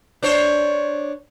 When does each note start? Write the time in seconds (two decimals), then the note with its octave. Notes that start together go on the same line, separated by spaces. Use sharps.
0.23 D4 C5 C#5